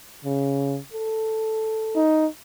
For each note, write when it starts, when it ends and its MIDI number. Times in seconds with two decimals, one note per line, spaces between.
0.25 0.77 49
0.93 2.03 69
1.96 2.27 63